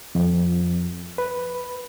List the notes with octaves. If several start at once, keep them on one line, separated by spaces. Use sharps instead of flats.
F2
B4